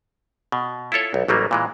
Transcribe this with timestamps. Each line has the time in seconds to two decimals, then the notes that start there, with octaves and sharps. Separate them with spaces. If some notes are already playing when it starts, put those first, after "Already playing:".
0.52 B2
0.92 E4 F4 A4 C#5
1.14 B1
1.28 A1 F#3 G3 A#3
1.51 A#2 E3 G#3